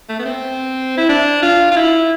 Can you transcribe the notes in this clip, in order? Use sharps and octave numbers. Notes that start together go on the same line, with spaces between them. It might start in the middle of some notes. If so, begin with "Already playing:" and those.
A3
B3
C4
E4
D4
F4
F4
E4